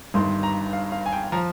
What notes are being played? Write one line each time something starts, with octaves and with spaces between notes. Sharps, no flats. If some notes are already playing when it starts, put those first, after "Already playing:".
G1 G2 D#3 C6
A#5
F5
F5
G#5
G5
F3 A#5